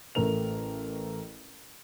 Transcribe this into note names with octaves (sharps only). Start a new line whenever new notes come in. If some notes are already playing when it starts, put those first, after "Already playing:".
A1 A3 A#4 F7